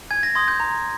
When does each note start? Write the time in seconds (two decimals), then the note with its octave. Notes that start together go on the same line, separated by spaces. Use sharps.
0.11 G#5 G#6
0.23 A#6
0.35 C6 D#6 G6 G#6
0.48 G6
0.60 A#5